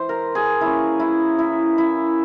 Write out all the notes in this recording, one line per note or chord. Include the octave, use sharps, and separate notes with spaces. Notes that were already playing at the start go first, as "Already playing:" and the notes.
Already playing: E3 C5 E5
A#4
G#4
E3 A#3 C#4 E4
E4
E4
E4